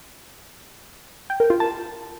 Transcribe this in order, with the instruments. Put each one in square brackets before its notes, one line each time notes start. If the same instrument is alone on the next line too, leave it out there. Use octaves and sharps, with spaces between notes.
[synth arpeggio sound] G5
A#4
F4
A5